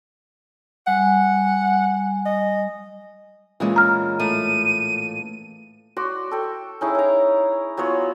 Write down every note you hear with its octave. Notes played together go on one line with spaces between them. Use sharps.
G3 F#5 G#5
D#5
A#2 E3 G#3 C#4
A#5 F6
A2 D#7
F#4 D5 C6
A4 G5 C#6
C#4 D#4 E4 G#4
A#4 A#5
F#3 B3 F4 C#5